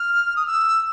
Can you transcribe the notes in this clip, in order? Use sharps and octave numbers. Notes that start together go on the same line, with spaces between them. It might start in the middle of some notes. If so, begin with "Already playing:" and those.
Already playing: F6
D#6
E6